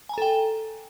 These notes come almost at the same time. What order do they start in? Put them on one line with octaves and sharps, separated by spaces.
G#5 A#5 A4 G5